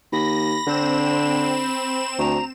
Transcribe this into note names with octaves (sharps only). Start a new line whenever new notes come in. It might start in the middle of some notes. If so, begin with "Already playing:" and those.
D#2 B5 A#6
D3 C4 E7
D2 A#5